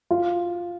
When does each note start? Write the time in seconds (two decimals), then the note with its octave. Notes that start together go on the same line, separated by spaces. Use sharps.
0.11 F4